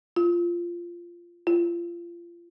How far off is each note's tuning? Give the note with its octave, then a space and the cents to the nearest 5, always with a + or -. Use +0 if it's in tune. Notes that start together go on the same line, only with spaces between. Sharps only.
F4 -10
F4 -30